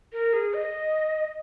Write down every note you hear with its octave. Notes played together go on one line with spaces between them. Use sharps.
A#4
G#4
D#5